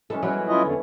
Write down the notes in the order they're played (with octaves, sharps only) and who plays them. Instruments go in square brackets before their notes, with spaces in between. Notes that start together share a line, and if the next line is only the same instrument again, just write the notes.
[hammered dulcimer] E3 G#3 C#4 [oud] A4
[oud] F#3 [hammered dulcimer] B3 C#4 E4
[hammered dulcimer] A3 C#4 [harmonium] E4 F4 D#5
[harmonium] E2 D3